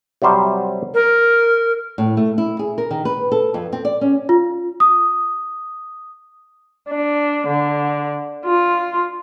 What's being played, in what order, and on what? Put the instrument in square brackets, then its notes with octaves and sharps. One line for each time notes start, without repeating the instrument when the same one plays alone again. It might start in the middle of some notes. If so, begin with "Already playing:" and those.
[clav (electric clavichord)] C3 F#3 G3 C5 E5
[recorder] A#4
[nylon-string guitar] A2
A3
E4
G#4
A#4
D#3
B4
A4
F2
C4
D5
C#4
[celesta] F4
D#6
[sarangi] D4
D3
F4